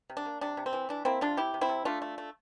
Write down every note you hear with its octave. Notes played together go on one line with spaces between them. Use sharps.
C3
D4
A#3
C3 D4
C3
C4
E3
E3 D4
A#3 C4 E4
C3 D4 F4
C3 E4 G4
C3
C4 E4
C3
A3 D4 F4
A3
A3